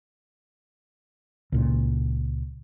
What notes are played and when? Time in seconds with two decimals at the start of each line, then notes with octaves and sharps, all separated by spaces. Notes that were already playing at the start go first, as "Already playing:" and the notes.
1.52 C#2 A#2